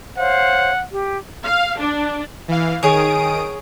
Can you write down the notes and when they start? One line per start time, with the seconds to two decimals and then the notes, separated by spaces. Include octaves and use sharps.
0.17 C5 C#5 F5 F#5
0.91 G4
1.44 F5
1.79 D4
2.48 E3 F5
2.83 D#3 G#4 C#5 D#6 D7